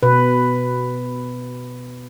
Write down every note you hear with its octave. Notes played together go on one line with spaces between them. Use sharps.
B2 B4